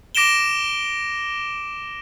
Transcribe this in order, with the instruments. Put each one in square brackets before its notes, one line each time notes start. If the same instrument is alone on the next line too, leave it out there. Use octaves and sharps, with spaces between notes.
[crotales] D6 A#6 D7 E7 G7